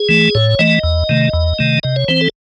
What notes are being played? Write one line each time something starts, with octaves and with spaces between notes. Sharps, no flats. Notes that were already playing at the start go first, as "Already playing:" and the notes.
Already playing: G#4
E3 A3
A2 C#5
E3 A3 D#5
E2
C3 D#3 A3
E2
C3 D#3 A3
C3 D#5
C#5
E3 C4 C5
A4